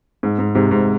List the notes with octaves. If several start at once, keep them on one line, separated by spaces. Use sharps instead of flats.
G#2
G#2
G#2 C3
G#2